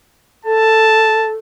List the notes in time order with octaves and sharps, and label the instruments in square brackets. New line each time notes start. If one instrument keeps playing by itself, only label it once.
[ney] A4 [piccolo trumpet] A5